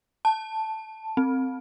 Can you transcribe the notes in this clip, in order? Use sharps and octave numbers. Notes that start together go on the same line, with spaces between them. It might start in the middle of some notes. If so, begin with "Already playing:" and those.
A5
C4